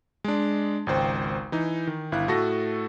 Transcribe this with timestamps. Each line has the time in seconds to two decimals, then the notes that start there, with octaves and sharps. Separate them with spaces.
0.24 G#3 D4
0.87 G#1 C#2 C5 G5
1.52 E3 D#4
1.87 D#3
2.12 G1 E4 F5 F#6
2.28 A2 A3 F#4 A4 A#6